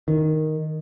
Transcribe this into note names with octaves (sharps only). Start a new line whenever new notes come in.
D#3